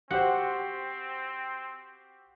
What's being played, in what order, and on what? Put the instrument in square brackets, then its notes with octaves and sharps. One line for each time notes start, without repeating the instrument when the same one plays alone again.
[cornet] C4 [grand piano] F#4 G4 C5 [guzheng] F#5